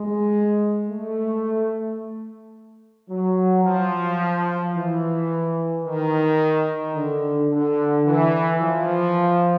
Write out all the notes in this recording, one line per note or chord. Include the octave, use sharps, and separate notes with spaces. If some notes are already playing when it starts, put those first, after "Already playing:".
Already playing: G#3
A3
F#3
F3
E3
D#3
D3
D3
E3
F3